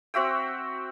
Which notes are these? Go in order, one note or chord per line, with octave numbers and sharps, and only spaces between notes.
C4 F#4 E5 G5